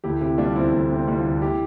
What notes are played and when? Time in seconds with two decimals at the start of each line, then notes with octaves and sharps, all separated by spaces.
0.04 D2 E4 G4
0.21 C3 E4 G4
0.38 G3 D4 F4
0.55 D2 C4 E4
0.73 D2 D4
0.90 C3
0.96 C4
1.08 G3 E4
1.19 D4 F4
1.24 D2
1.42 E4 G4